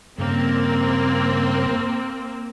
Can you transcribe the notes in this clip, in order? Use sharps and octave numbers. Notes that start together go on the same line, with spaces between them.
G2 C#3 A#3 C4